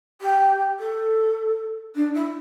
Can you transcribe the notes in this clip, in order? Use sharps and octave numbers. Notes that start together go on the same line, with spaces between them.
G4
A4
D4
E4